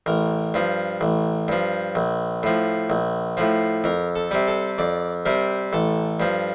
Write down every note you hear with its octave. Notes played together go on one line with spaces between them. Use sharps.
A1 A#4
G2 F3
A1
G2 F3
A#1
A2 F3
A#1
A2 F3
F2 A#4
A4
C3 G3
A4
F2 D5
C3 G3 A#4
A1 A4
G2 F3